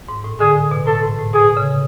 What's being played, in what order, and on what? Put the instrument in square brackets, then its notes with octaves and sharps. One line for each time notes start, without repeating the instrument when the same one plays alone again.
[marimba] G#2
A2
[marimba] D3 [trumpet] G#4
[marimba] A2
B2
[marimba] A2 [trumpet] A4
[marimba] G#2
A2
[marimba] B2 [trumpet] G#4
[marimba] C#3